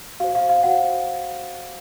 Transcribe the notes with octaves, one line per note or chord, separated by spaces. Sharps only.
F#4 C5 F5
F5
F5
F#4 C5 F#5